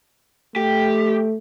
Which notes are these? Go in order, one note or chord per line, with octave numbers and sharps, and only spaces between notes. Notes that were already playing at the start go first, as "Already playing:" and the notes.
A3 G4